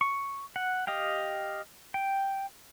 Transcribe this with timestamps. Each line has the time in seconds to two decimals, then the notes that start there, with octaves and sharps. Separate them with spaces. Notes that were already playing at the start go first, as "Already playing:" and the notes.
0.01 C#6
0.56 F#5
0.87 G4 D#5 F5 G5
1.94 G5